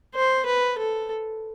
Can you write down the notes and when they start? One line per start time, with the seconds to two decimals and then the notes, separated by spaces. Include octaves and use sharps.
0.15 C5
0.46 B4
0.78 A4